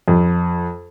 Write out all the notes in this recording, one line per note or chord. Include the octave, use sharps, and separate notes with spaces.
F2